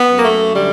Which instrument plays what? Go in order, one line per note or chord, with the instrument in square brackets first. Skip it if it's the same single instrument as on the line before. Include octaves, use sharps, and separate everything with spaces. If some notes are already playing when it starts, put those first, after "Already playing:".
Already playing: [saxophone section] B3
F#2
A#3
A3
D3 G3